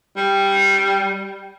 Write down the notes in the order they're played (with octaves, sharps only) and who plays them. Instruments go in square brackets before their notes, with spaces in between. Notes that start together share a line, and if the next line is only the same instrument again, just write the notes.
[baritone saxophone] G3